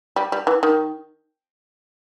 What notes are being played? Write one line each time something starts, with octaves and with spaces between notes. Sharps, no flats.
G3
G3
E3
D#3